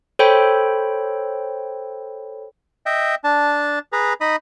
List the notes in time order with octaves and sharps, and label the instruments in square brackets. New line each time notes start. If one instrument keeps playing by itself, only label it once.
[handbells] A4 C5 C#5 G5 B5
[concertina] D#5 E5 G5
D4 A5
G#4 B4 A#5
D#4 D#5 B5 D#6